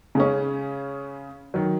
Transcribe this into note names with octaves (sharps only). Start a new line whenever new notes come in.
C#3 G#3 C#4
D#3 F#3